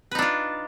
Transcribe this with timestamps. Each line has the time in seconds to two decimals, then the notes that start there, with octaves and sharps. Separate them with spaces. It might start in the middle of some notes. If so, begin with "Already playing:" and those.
0.11 B4
0.15 D#4
0.19 D4
0.22 F4